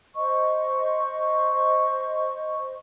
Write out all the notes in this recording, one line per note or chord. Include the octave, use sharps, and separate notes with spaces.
C5 D#5 C#6